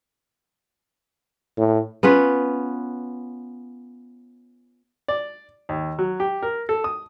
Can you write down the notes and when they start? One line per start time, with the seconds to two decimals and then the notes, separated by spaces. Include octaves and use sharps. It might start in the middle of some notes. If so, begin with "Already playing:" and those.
1.58 A2
2.03 B3 C#4 F4 B4
5.08 D5
5.69 D#2
5.99 F#3
6.20 G4
6.42 A#4
6.69 A4
6.84 D#6